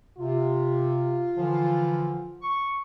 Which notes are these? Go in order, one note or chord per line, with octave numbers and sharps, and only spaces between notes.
C3 F4
D3 E3 F3
C#6